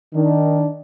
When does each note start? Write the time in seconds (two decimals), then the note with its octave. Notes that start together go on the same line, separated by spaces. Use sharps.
0.14 D#3 D4